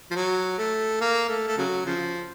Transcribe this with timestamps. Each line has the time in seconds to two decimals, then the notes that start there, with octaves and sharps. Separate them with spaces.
0.11 F3
0.15 F#3
0.58 A3
1.01 A#3
1.29 A3
1.47 A3
1.58 C#3 F#3
1.86 C#3 F3